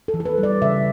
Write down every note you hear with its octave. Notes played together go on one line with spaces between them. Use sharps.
A4
E3
A4
B4
G3
D5
C#3 E5